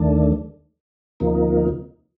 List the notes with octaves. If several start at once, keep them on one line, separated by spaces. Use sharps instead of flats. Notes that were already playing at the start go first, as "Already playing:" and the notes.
Already playing: D#2 D#3 A3 D4
D2 C3 F3 A#3 D#4